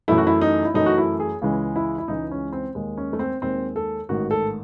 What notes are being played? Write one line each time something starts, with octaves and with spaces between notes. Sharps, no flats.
F#2 E3 A3 E4
F#4
E4
D#4
E4
F#2 E3 A3 D#4
F#4
E4
G#4
C#2 C#3 E3 G#3
E4
E4
C#2 C#3 E3 G#3 D#4
C#4
C4
D#2 D#3 G#3
C#4
A3
C4
D#2 D#3 G#3 C4
A4
A1 G#2 D#3 F#4
A4